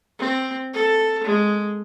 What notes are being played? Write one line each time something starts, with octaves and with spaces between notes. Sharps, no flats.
C4
A4
G#3